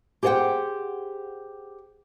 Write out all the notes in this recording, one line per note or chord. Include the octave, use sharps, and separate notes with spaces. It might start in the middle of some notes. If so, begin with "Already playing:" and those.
G4 G#4 C5 D5 F#5 G5